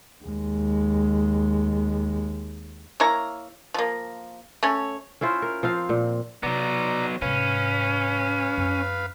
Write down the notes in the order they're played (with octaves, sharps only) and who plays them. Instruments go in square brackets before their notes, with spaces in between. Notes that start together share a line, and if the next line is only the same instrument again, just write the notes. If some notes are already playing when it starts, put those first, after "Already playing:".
[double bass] D#2 G#3
[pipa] A#3 E4 C#5 A#5
F3 A#3
A3 C#4 C#5
[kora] C#4 E4 F4 C5
A#4
F3 C4 F5
A#2
[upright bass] C3 [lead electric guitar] F#3 B3 [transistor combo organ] D5 A#5
[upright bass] G#2 C3 [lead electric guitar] C#4 [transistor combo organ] B4 F5
[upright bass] F#2 E4